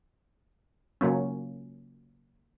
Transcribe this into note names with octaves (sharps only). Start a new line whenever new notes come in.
C#3 F#3 A#3 C#4